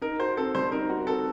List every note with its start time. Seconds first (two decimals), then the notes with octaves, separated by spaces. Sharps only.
0.02 D#4 A#4
0.19 F#4 C5
0.37 C4 A4
0.55 G3 C5
0.72 D#4 A#4
0.89 F#4
1.07 C4 A4